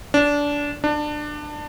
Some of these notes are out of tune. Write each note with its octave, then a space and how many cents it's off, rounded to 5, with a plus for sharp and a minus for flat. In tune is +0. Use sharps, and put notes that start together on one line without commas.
D4 -20
D4 +20